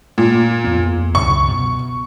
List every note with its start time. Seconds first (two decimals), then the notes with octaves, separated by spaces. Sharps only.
0.18 A#2
0.64 F2 A#3 B3
1.15 C#2 F#2 B2 C#6
1.48 B2